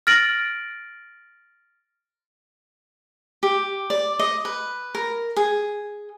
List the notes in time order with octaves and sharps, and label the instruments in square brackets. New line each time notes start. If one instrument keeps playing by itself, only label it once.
[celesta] F6 A6 A#6 D7 F#7
[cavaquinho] G4
D5
D#5
B4
A#4
G#4